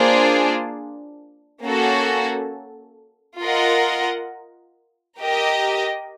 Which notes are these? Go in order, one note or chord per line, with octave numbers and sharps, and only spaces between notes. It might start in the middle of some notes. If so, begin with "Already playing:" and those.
Already playing: A#3 D4 F4 G#4 C5
A#3 C#4 F#4 A4
F4 A#4 D#5 F#5
G4 A#4 D#5